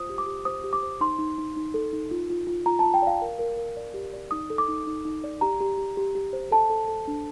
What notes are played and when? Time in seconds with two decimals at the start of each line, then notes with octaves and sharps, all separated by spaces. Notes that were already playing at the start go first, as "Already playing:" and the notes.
Already playing: F4 C5 D#6
0.09 G4
0.18 D6
0.27 G4
0.45 C5 D#6
0.64 G4
0.73 D6
0.83 C5
1.01 D#4 C6
1.19 D#4
1.38 D#4
1.56 D#4
1.74 A4
1.93 D#4
2.11 F4
2.30 F4
2.47 F4
2.66 F4 A#5
2.79 F4 A5
2.94 G5
3.02 D5 F5
3.22 A#4
3.39 A#4
3.57 A#4
3.77 D5
3.94 G4
4.13 D5
4.31 D#4 D#6
4.50 A4
4.58 D6
4.68 D#4
4.87 D#4
5.05 D#4
5.24 D5
5.41 G4 A#5
5.60 G4
5.78 G4
5.97 G4
6.15 G4
6.33 C5
6.51 A4 A5
6.70 A4
6.88 A4
7.07 D4